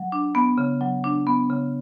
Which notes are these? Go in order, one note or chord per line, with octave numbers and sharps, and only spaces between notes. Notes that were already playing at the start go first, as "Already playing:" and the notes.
Already playing: F#3
D4
B3
C#3
F#3
D4
B3
C#3